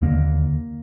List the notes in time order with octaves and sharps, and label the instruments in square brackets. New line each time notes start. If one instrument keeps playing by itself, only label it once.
[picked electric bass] D#2 D3 A#3